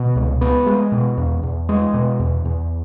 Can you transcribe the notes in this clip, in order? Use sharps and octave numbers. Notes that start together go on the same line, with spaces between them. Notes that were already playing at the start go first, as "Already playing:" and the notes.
Already playing: B2
C#2
B3
G#3
B2
E2
E2
G#3
B2
E2
E2